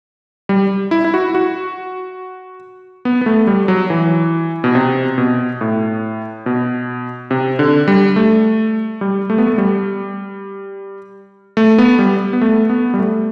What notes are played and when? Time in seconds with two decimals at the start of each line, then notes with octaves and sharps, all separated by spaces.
0.49 G3
0.91 E4
1.04 E4
1.14 F#4
1.35 F#4
3.05 B3
3.21 B3
3.26 A3
3.47 G3
3.68 F#3
3.90 E3
4.64 B2
4.75 C3
5.18 B2
5.61 A2
6.46 B2
7.31 C3
7.59 D3
7.88 G3
8.16 A3
9.01 G3
9.30 A3
9.38 B3
9.47 A3
9.58 G3
11.57 A3
11.78 B3
11.99 G3
12.33 B3
12.41 A3
12.70 B3
12.94 G3
12.99 A3